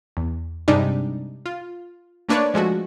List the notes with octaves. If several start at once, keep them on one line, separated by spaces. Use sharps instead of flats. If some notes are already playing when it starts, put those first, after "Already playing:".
E2
G2 C3 G3 G#3 D4 D#4
F4
A3 A#3 D4 B4 C#5 D5
F3 G#3 A3 F#4